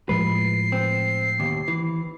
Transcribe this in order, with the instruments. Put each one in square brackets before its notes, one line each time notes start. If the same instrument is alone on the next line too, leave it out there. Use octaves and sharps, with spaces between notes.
[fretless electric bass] A2 F3 G#3 [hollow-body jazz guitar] B4 [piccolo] C7
[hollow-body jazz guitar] C4
D#2 B2
E3